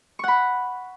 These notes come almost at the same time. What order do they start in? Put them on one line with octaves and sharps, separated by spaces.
C#6 F#5 B5